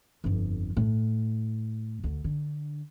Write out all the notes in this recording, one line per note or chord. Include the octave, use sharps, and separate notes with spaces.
G1 F2
A2
D2
D3